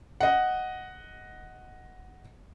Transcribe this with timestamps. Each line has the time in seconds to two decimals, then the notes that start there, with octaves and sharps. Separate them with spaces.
0.20 D#5 F#5